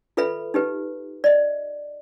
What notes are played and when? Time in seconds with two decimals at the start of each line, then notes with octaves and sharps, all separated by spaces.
0.17 F4 A4 B4 E5 B5
0.54 D#4 G4 B4
1.24 D5 D#5